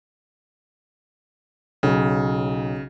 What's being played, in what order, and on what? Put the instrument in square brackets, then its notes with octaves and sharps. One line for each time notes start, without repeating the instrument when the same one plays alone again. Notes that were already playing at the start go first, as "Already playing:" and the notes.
[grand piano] B1 [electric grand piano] C#3